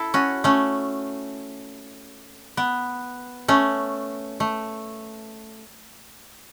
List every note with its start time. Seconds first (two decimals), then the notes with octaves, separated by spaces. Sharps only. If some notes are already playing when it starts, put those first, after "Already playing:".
Already playing: E4 A4
0.14 C#4 F#4
0.44 A3 C#4
2.57 B3
3.48 A3 C#4
4.40 A3